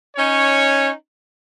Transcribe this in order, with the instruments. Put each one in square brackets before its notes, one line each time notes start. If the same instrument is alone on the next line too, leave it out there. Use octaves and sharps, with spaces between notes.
[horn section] C#4 D#4 C#5